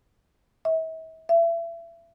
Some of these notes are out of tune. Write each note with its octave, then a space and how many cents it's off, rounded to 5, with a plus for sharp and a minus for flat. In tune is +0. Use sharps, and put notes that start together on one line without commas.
E5 -40
E5 +30